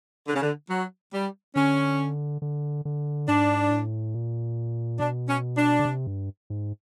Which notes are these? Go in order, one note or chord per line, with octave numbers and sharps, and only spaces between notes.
D3
C#3
D3
F#3
G3
D3 C#4
D3
D3
G#2 D4
A2
A#2
B2 D4
C#4
D4
C#3
C3
G2
G#2